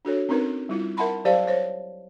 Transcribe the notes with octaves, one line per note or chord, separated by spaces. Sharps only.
D4 F#4 A4 C#5
C4 C#4 D#4 A#4 B4
G3 E4 F4
A#4 E5 F#5 A5 B5 C6
F#3 G4 C5 D5 F5 A5
C5 C#5